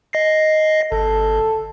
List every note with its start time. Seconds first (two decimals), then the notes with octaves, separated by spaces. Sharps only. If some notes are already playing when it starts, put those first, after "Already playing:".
0.13 D#5 A#6 C7
0.92 G1 A4